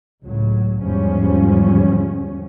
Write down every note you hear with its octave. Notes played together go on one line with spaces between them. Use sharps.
C#2 A2 F#3
E2 G#2 D3 F3 G3 C#4